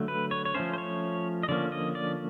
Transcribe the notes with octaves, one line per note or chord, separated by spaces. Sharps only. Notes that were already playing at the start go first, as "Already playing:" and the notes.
Already playing: D3 F#3 A3
B4
C#5
C#5
F3 A3 C#4 C5
C5
C#5
D#5
D3 F3 A#3 C#4 D5
D#5
D5